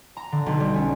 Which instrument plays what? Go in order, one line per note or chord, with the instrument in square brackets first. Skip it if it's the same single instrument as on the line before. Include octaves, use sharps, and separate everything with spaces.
[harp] A#5
D3
B1
G3
C#4